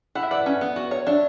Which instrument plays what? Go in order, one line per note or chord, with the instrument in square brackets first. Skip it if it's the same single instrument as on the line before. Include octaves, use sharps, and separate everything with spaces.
[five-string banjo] E4 [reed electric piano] F#5
[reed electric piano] E5
[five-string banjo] B4 [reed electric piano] D5 F#5
[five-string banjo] C#4
B3
F#4
C#5
[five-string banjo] D4 [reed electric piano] C#5 E5